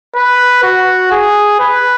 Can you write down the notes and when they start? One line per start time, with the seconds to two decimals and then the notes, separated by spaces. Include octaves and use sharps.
0.15 B4
0.63 F#4
1.11 G#4
1.60 B4